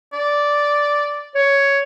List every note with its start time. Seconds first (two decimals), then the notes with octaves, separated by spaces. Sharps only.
0.13 D5
1.35 C#5